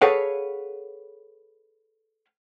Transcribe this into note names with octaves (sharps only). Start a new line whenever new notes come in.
G#4 A4 B4 C#5 F5 F#5